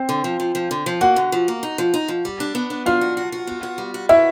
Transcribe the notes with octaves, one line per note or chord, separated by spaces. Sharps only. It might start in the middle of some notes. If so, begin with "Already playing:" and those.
Already playing: C4 C5
D3
F3
F3
F3
D3
F3
A#3 F#4 F#5
D3
F3
A#3
D#4
F3
D#4
F3
G3
D4
B3
D4
D4 F4 F5
F#4
F#4
F#4
B3
F#4
G3
F#4
E4 F#4 E5